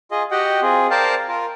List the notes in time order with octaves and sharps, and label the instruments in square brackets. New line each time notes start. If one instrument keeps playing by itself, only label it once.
[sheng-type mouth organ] F4 G#4 D#5
F#4 G4 D#5 F#5 G5
C4 F4 G#4
A#4 C5 D5 F5 G5 A5
F4 A#4